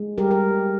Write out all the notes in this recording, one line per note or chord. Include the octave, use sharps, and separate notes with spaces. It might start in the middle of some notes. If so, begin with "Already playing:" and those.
Already playing: G#3
G3 G4 A#4
A#4